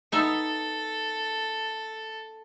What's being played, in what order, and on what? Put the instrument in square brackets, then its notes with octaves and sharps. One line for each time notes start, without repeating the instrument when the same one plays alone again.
[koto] B3 D#4 E5 [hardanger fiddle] A4